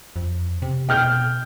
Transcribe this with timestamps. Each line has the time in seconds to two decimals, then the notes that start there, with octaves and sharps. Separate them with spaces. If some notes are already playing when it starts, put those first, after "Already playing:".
0.16 F2
0.62 C3
0.89 B2 G5 F6 G6